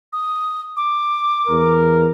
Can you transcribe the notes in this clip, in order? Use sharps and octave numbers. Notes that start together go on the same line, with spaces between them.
D#6
D6
E2 A#4